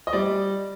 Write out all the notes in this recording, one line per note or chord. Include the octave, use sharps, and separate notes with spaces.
D#5
G3 D5